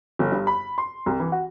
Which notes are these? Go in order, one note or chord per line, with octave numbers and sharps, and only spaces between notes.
G1
G2
B5
C6
C2
E3
F#4